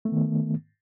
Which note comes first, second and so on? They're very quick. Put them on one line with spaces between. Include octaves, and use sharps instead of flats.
A3 B3 D#3